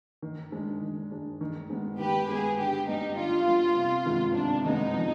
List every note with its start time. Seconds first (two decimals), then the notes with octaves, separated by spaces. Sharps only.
0.22 D#3
0.52 G#3 D4
0.82 D#3
1.11 G#3 D4
1.41 D#3
1.70 G#3 B3
1.99 D#3 G4 B4
2.28 G#3 B3 G#4
2.58 D3 G4
2.88 G3 B3 D#4
3.17 D3 F4
3.47 G3 B3
3.76 C3
4.06 D#3 G#3 B3
4.35 C3 D4
4.65 D#3 G#3 B3 D#4
4.94 F3